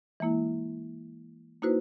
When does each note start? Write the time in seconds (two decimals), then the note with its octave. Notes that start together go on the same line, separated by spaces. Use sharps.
0.20 E3 G#3 A#3 E4
1.62 A#3 D#4 E4 F#4 B4 C5